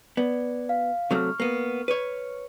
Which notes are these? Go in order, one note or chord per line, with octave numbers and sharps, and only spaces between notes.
B3 D5
F5
C3 F#3 A3 C#6 F6
A#3 B3
B4 C#5